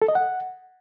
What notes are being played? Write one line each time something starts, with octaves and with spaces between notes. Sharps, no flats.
A4
D#5
F#5